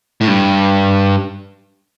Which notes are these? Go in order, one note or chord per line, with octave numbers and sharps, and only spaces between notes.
A2
G2